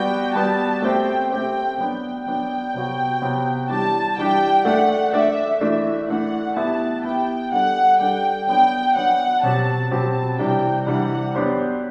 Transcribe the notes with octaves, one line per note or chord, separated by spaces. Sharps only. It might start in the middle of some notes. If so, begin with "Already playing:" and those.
Already playing: G3 B3 F#4 B4 D5 G5
G3 B3 F#4 B4 D5 A5
A3 C4 G4 C5 G5
A3 C4 G4 C5 G5
F#3 B3 D4 G5
F#3 B3 D4 G5
C3 F#3 B3 F#4
C3 F#3 B3 F#4
E3 G3 D4 G4 A5
E3 G3 D4 G4 G5
A3 D4 A4 D5 F#5
A3 D4 A4 D5 E5
E3 A3 D4 E5
E3 A3 D4 F#5
B3 E4 G4 A5
B3 E4 G4 G5
G3 D4 A4 F#5
G3 D4 A4 G5
F#3 B3 D4 G5
F#3 B3 D4 F#5
B2 F#3 C4 G4 A5
B2 F#3 C4 G4 A5
C3 E3 G3 D4 G5
C3 E3 G3 D4 F#5
F#3 B3 D4 G4 C5